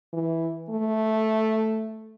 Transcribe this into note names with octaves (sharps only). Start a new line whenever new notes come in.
E3
A3